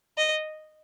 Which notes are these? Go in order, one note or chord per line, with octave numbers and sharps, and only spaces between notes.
D#5